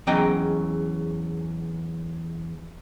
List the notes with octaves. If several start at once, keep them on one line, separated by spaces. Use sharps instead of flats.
E2 C#3 F#3 D#5 G5 A#5